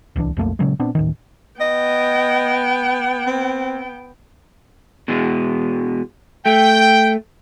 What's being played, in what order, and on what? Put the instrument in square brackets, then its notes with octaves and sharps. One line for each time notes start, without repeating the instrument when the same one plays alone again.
[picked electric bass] D1 C2 E3 D4
B1 F2 A3 A#3
A#2 C#3 F#3 G#3
A#2 B3 C4 D4
D1 A1 D#3
[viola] B3 G5 [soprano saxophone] D#5
[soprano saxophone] C4
[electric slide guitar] B2 E3 G#3
[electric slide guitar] A3 [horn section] G5